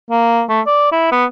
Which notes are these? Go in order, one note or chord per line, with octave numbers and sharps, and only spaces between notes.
A#3
A3
D5
E4
B3